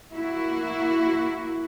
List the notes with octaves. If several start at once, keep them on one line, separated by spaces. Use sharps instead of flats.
A#3 E4 F#4